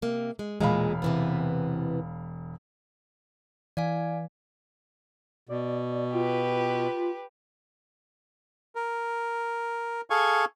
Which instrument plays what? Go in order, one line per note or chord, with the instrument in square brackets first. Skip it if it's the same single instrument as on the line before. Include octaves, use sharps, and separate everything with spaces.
[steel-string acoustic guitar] C3 A#3
G#3
[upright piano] E1 F5 B5 [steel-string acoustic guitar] A#2 G#3
[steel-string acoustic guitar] C3 E3 B3
[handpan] E3 [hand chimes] D5 F5 G#5
[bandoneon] B2 [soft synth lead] D5
[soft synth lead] F4 [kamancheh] G4 B4
[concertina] A#4
G#4 A4 F5 G#5 C#6